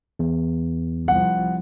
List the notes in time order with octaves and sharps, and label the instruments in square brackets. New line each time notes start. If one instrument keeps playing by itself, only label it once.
[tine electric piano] E2
[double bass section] C2 F3 [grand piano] F#5